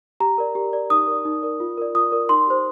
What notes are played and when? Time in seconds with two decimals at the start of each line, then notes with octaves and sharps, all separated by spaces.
0.20 G4 A#5
0.38 A#4 D5
0.55 G4
0.73 A#4 D5
0.90 D#4 D#6
1.07 A#4 D5
1.25 D#4
1.43 A#4 D5
1.60 F4
1.78 A#4 D5
1.95 F4 D#6
2.12 A#4 D5
2.29 D#4 C6
2.47 G4 C5